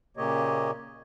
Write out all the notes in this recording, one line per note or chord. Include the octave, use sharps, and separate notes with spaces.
A#2 C#3 A#3 G4 C#5 D#5